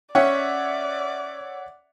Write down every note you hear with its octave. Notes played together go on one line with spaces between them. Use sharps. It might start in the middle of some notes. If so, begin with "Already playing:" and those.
C#4 C#5 D5 E5 F#5